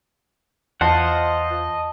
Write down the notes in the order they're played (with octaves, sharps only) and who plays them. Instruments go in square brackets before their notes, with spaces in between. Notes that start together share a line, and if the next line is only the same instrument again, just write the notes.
[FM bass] E2 [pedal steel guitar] F4 C5 F#5 [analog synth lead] D#5 [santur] A5